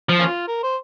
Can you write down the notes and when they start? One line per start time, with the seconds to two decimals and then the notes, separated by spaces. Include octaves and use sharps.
0.09 F3
0.19 A#3 C#4 F4
0.47 A#4
0.63 C5